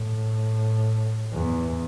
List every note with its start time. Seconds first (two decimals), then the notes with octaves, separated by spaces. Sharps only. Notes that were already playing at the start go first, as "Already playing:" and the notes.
Already playing: A2
1.33 E2